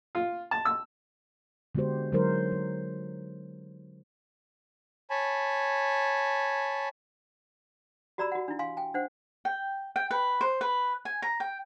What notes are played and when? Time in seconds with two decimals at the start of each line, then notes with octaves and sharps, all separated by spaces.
0.15 F4
0.51 A5
0.65 E6
1.75 D3 G#3 B3 F#4 G4 C5
2.12 D3 F#3 G#3 D#4 A#4 C5
2.52 G#3
5.10 C#5 G#5 A5 B5
8.18 F#4 G4 D5 A#5 B5 E6
8.32 F#4 F#5
8.48 D4 E4
8.59 F5 G#5 C6
8.77 G5 G#5
8.94 D4 C5 F#5
9.45 G5
9.96 G5
10.11 B4
10.41 C5
10.61 B4
11.05 G#5
11.22 A#5
11.40 G5